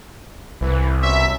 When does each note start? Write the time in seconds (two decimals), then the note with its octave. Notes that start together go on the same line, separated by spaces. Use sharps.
0.61 C2 E3
1.02 B2 C#4 E5